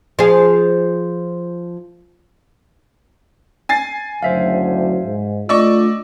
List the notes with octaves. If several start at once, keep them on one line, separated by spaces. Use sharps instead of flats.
F3 G#4
G#5 A6 C7
F#1 D2 F#3 C5 E5 F5
G#2
A3 D4 F4 D5 D#5 C#6 E6